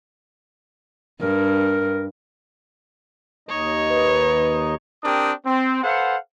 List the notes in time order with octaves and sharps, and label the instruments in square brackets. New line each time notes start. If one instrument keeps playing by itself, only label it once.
[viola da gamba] G2 [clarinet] A#4
[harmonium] D#2 D#4 D#5 [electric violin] C#5
[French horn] B4
[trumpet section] C4 D4 G4 A#4 G5 D#6
C4
A4 B4 C5 F5 F#5